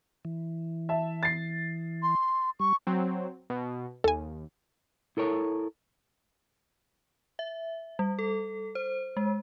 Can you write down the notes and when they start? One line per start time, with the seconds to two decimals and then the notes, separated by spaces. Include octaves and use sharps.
0.25 E3
0.89 E5 A5
1.23 A6 C7
2.03 C6
2.60 G3 C#6
2.87 F#3 C4
3.50 B2
4.04 D#2 A4 G#5
5.17 E4 A4 A#4 C#5
7.39 E5
7.99 G3
8.19 A4
8.75 C5
9.17 G#3